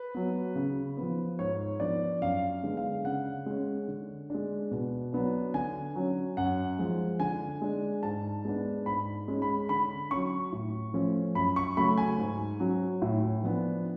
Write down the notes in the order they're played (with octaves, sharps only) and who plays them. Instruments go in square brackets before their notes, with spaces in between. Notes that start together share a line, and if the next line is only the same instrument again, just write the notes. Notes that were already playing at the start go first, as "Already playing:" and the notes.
Already playing: [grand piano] B4
F#3 B3
C#3
F3 B3
G#2 C#5
F3 B3 D4 D5
F#2 F5
D3 G#3 B3 D4
F5
C#3 F#5
G#3 C#4
D3
G#3 D4
B2
F#3 B3 D4
D3 G#5
F#3 C#4
F#2 F#5
F3 G#3
D3 G#5
G#3 D4
G#2 A5
G#3 B3 D4
G#2 B5
G#3 C#4
B5
D3 B5
F#3 C#4 C#6
A2
F3 A3 C#4
F#2 B5
C#6
C#3 F#3 A3 B5
G#5
G#2
F#3 C#4
A2
F3 B3 D4